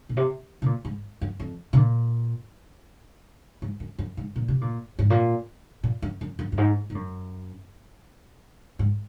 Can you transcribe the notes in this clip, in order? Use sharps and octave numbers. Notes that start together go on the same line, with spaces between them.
A#2
C3
C3
A#2
G#2
F#2
F2
C3
A#2
G#2
F#2
F#2
G#2
A#2
C3
A#2
G#2
A#2
A#2
F#2
F#2
F#2
F#2
G#2
G#2
F#2
G#2